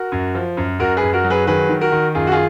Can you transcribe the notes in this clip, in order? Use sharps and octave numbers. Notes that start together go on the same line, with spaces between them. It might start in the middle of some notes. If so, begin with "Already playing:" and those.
Already playing: F#4 A#4
F#2
F3
F#2
F#2 F#4 A#4
G#4 B4
F#2
F#4 A#4
F#3
G#4 B4
D#3 G#4 B4
D#3
F#4 A#4
D#3
F#2 F4 G#4
F#4
F4 G#4